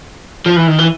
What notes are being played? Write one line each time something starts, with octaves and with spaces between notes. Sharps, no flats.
F3
E3
D#3
E3